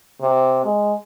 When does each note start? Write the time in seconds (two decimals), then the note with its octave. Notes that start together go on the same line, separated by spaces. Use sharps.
0.21 C3
0.65 G#3